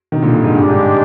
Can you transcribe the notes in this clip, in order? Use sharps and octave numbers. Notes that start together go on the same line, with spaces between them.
C3 D#3
A#2 D3
G2 A#2
G#2
G2 G#3 D4 G4
G#2